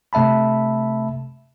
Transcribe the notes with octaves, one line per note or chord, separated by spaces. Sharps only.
C3 A3 E5 A5 B5